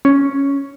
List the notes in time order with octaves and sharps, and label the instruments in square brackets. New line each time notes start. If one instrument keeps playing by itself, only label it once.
[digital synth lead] C#4